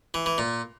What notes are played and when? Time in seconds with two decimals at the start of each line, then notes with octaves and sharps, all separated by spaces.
0.14 E3
0.26 E3
0.38 A#2